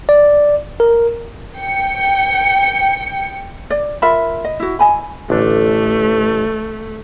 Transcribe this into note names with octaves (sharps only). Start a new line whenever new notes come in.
D5
A#4
G5 C#7
D5
F4 A#4 E5 B5
D#5
E4 F#4
D#5 G#5 B5
A1 D3 A3 D4